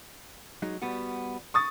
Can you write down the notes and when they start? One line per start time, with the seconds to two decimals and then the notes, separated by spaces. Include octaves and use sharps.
0.62 F#3 G#3 D#4
0.82 G3 B3 F#4
1.54 C#6 D#6 A6